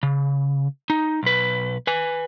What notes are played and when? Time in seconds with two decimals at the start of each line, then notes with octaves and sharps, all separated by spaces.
0.03 C#3
0.90 D#4
1.23 B1 B4
1.87 B4 G#5